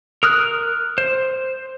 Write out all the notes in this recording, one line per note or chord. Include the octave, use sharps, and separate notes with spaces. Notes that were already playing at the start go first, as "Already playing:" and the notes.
A#4 D#6 F6 F#6
C5